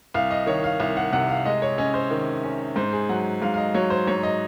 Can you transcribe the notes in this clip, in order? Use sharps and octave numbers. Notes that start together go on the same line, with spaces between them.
C2 F5
D#5
D#3 C#5
F5
C2 F5
F#5
C3 F#5
F5
G#3 D#5
C#5
C#4 D#5
C5
D#3
C#4
G#2 C5
G#4
F#3 F#5
G#2 F5
F5
D#5
F#3 C#5
C5
G#2 C#5
D#5